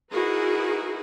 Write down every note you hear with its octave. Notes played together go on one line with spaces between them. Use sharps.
D#4 E4 F#4 G#4 A#4 B4